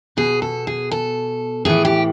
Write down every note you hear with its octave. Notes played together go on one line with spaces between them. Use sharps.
B2 G#4
A4
G#4
A4
A2 E3 G#4
G4